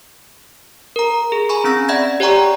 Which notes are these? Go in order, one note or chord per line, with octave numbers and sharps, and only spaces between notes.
A#4 A#5
G#4
G#5 A#5 B5 C#6
C4 C#4 E6 A#6
D5 E5 F#5 B5 G#6 A#6
G4 C#5 D5 G5 A#5 C#6